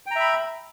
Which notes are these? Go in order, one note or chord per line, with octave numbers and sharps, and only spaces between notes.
E5 G5 A#5 B5